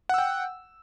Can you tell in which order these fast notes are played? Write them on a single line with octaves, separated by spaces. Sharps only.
F#5 E6 G5